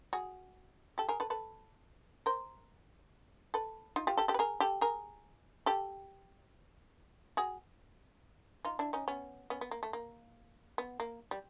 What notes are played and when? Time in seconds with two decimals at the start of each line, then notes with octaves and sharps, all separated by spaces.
0.13 F#4 G#4
0.98 G4 A4
1.09 G#4 A#4
1.20 A4 B4
1.30 A4 B4
2.26 A#4 C5
3.54 A4 B4
3.96 D#4 F4
4.07 F4 G4
4.17 G4 A4
4.28 G4 A4
4.34 B4
4.39 G#4 A#4
4.60 G4 A4
4.81 G#4 A#4
5.66 G4 A4
7.37 F#4 G#4
8.65 D#4 F4
8.79 D4 E4
8.93 C#4 D#4
9.08 B3 C#4
9.50 B3 C#4
9.61 B3
9.71 A#3
9.83 A3
9.93 A#3
10.78 B3
11.00 A#3
11.31 G3